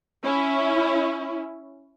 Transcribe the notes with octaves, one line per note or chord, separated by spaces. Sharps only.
C#4 E4